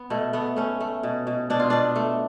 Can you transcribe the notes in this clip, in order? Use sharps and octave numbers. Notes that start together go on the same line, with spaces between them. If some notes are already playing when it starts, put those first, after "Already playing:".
Already playing: B3
B2 A3
A3 B3
A3 C#4
A3
B2
B2
B2 D4
F4
B2 D4
A3